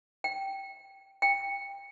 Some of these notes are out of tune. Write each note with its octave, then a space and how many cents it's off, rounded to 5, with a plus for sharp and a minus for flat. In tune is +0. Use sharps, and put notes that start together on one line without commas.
G5 -10
G5 +20